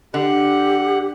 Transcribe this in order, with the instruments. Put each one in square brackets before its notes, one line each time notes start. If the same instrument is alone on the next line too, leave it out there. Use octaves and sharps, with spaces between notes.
[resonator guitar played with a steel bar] D3 [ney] G4 [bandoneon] F#5 F#6